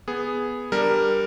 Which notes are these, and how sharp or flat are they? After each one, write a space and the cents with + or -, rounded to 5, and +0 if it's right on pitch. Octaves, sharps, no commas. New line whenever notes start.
B3 +0 G#4 +0
G3 +10 D4 +0 A#4 +0